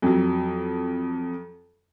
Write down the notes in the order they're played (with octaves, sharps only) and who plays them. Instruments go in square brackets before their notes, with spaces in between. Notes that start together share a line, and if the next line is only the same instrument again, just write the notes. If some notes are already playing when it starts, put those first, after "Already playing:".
[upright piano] F2 F#3